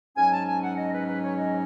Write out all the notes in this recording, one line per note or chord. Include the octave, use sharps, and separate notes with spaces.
G#2 F#3 C#4 G#5
A5
G#5
F#5
D#5
B4
B4
C#5
D#5